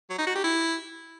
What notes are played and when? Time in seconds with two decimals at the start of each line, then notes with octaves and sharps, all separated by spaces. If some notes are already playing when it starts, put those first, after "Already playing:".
0.10 F#3
0.18 D#4
0.27 F#4
0.35 G4
0.44 E4